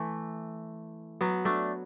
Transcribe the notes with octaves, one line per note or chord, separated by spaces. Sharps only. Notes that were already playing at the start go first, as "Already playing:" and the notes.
Already playing: E3 A3
F#3 B3
A3 D4